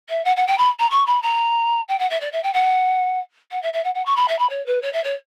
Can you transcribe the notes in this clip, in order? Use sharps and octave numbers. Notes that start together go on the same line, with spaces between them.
E5
F#5
F#5
G5
B5
A#5
C#6
B5
A#5
G5
F#5
E5
D5
E5
G5
F#5
F#5
E5
E5
F#5
F#5
C#6
B5
E5
B5
C#5
B4
C#5
E5
C#5